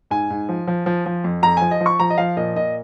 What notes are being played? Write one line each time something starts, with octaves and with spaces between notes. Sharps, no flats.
G#2 G#5
G#2
F3
F3
F3
F3
F2
F2 A#5
F3 G#5
D#5
F3
C#6
F3 A#5
D#5
F3 F5
A#2 D#5
A#2 D#5